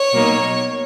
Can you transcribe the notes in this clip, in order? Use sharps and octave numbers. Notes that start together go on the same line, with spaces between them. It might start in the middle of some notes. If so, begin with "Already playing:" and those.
Already playing: C#5
B2 F#3 A#3 D#4